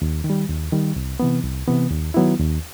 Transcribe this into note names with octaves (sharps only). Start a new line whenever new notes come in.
D#2
D#3
G3
D#2
D#3 G3
C2
C3 E3 B3
C2
C3 E3 B3
D#2
D#3 F#3 B3 E4
D#2